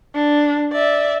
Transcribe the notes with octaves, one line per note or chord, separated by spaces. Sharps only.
D4
D5 E5